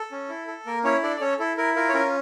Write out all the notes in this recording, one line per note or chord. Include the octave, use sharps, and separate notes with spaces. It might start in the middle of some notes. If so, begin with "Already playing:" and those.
Already playing: A4
C#4
E4
A4
A#3 A#4
C#4 E4 C#5
D4 A4 D5
D5
C#4 A4 C#5
E4 A4
E4 A#4
F4 A#4
C#5
C#4 A#4